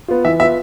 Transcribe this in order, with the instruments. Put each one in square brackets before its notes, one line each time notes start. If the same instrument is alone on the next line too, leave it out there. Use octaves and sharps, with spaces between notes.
[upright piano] B3 F4
[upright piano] E3 [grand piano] E5
[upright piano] B3 F4 [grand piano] E5